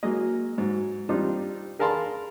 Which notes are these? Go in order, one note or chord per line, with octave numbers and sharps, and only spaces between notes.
F#3 G#3 A#3 D#5
G#2 F#3
G3 C4 D4 D#4 F4
G#4 A#4 F5 A5 B5 C6